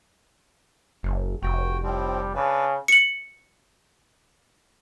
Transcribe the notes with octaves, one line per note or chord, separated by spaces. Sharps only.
F#1
F1 F#4 G5
A2 F3 G3 C4
C#3 D4 B4
C#7 F#7